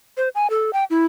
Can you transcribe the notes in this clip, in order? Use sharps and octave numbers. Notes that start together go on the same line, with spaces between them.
C5
G#5
A4
G5
E4